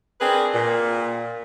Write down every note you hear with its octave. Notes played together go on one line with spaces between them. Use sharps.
C4 D4 G#4 A#4 B4
A#2